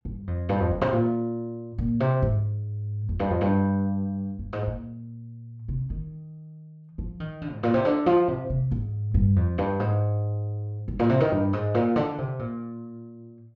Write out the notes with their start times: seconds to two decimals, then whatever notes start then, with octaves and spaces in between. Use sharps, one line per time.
0.05 G2
0.27 F2
0.49 G2
0.60 F2
0.71 G2
0.81 C3
0.93 A#2
1.78 A#2
2.00 C3
2.22 G#2
3.09 F2
3.19 G2
3.30 F2
3.41 G2
4.39 G2
4.53 G#2
4.67 A#2
5.68 C3
5.90 D#3
6.98 F3
7.20 D#3
7.41 D3
7.52 G#2
7.63 A#2
7.74 C3
7.85 D3
8.06 F3
8.28 C3
8.50 C3
8.71 G#2
9.14 G2
9.36 F2
9.58 G2
9.80 G#2
10.88 G2
10.99 A#2
11.09 C3
11.20 D#3
11.32 G2
11.53 G#2
11.74 A#2
11.96 D3
12.18 C3
12.39 A#2